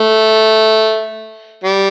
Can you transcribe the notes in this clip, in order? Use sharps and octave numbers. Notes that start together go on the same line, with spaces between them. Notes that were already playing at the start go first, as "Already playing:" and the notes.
Already playing: A3
G3